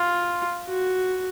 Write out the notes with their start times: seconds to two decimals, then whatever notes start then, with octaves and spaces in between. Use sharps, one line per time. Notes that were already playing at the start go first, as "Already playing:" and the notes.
Already playing: F4
0.68 F#4